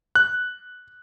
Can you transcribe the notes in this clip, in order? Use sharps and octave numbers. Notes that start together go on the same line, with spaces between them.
F#6